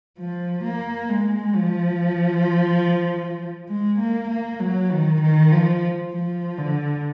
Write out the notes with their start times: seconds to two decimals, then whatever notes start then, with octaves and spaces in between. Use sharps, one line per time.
0.19 F3
0.64 A#3
1.10 G#3
1.55 F3
3.69 G#3
3.99 A#3
4.30 A#3
4.60 F#3
4.91 D#3
5.21 D#3
5.52 F3
6.12 F3
6.58 D3